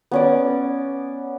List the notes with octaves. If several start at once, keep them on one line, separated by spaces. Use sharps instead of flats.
B3 C#4 D5